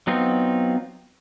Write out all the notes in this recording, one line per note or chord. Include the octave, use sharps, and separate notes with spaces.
F#3 B3 C4 D#4 F4